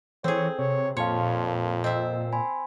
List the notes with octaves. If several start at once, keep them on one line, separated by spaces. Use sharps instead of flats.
E3 C4 G#4 A4 C#5
C3 C#5
F2 A#2 C#5 F5 A5 C6
C4 D#5 E5
G#5 B5 C6